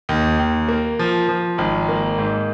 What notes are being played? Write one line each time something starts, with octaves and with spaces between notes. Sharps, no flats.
D#2
D#2
A#3
F3
F3
G#1
A#3
G#2